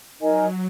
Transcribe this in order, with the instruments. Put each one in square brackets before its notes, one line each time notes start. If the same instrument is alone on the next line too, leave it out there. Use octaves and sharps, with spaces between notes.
[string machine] F#3 [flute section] D#4 A#4 D#5 G#5